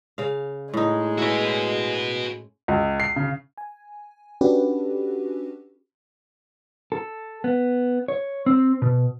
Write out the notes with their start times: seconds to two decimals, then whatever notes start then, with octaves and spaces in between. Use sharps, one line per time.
0.18 C#3 F5
0.74 A2 G#3 D#4
1.18 C#4 E4 F#4 B4
2.68 C#2
3.00 C7
3.16 C#3
3.58 G#5
4.41 C#4 D4 F#4 G4 A4 B4
6.92 A4
7.44 B3
8.08 C#5
8.46 C4
8.82 B2